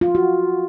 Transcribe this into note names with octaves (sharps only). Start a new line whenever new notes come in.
F4
F#4